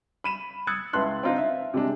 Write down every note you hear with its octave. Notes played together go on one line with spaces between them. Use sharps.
B5 D#7 E7
D#6 E6 F#6 G#6 A6 C#7
C#2 E4 B4 A5 C6 F#6
C4 D4 D#4 F4
E5
C3 G#3 D4